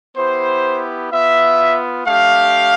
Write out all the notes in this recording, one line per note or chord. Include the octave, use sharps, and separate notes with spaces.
B3 E4 G4 C5
B3 F4 E5
A3 D4 G4 F5